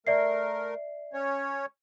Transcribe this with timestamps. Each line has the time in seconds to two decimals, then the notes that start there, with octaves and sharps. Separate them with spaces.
0.07 A3 A#4 D5 E5 C7
1.13 C#4 C#5